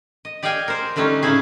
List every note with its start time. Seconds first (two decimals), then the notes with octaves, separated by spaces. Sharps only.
0.25 D#5
0.43 G4 D5 D#5 F5 G5 G#5
0.68 A#4 C5
0.96 D3 G3 A3 C#4 D#4
1.22 A2 C#3 C#4 D#4 E4 G#4